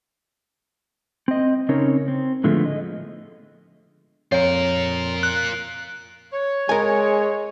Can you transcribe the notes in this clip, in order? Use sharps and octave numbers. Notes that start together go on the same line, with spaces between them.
C4 D#5
C#3 C4 C#4 D#4 A#4 C#5
C4
A2 D3 F3 G#3 A3 B3
D#5
F2 F4 A#4 C#5
F#6
C#5
G#3 A#4 G#5